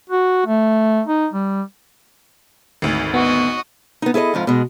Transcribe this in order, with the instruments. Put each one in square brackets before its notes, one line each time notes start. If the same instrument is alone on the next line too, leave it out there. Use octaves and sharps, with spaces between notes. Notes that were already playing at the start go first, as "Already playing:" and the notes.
[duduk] F#4
A3
D#4
G3
[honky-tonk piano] G#1 D2
[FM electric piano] B3 [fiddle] F#4 D#5
[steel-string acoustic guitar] B3 D#4
E4 G#4 A4 C#5 D#5
F2 G#2 F3
B2 G#3